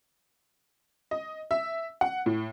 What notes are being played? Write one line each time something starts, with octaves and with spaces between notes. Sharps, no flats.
D#5
E5
F#5
A2